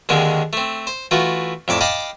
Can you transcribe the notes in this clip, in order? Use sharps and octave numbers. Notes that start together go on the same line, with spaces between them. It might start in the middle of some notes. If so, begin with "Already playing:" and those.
D#2 D3 D#3 G#3 C4
A3 C4
C5
E3 A3 F4 F#4
F2 A2 D5 A5
D#5 F5 G5 A5 B5 D6